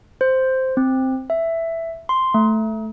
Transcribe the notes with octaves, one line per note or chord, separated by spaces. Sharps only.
C5
C4
E5
C6
A3